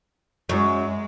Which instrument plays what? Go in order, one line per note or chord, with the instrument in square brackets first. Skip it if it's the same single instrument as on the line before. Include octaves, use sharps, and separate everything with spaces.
[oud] F#2 [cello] G#3